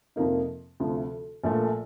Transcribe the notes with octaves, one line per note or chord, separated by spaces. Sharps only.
F2 C3 F3 A#3 D#4
D2 C3 F3
A#1 A#2 A3